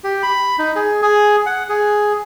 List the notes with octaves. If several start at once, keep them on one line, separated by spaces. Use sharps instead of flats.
G4
B5
D#4
G#4
G#4
F#5
G#4